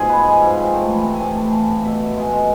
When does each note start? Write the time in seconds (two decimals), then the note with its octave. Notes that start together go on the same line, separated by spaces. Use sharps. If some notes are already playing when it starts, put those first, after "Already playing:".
Already playing: G#2 B2 F4 G#4
0.09 G#3 B4
0.25 F3 G#5
0.41 G#2
0.57 C3
0.73 A3
0.88 E3
1.04 C3
1.14 G#5
1.20 A2 A5
1.36 A3 A5
1.52 E3 F5
1.69 A2
1.85 B2 E5
2.00 B2
2.17 G#3
2.33 G#3